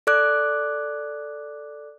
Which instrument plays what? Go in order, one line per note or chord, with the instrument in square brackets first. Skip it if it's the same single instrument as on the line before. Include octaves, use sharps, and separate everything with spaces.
[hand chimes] A4 D5 D6 F#6